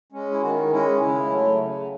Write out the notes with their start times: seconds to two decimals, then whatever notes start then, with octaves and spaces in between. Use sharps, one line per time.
0.12 G#3 C#4
0.31 E4
0.42 D#3 F#4
0.70 G#3 C#4 E4
0.99 C#3 E4
1.29 F#3 A3
1.58 C#3